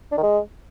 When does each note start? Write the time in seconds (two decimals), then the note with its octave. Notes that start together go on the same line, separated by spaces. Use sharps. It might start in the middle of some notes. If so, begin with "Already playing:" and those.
0.12 D4
0.17 D#3
0.23 G#3